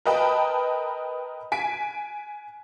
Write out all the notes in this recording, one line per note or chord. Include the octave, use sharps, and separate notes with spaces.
A#4 B4 D#5 G5 A5 B5
G#5 B6 D7